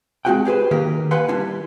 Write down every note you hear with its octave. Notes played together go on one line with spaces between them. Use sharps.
G#3 C4 E4 F#4 F#5 G5
G4 G#4 B4 C5
D#3 F#3 A#3 G4 A#4
A#4 B4 F5 F#5 G#5 C6
G3 D4 E4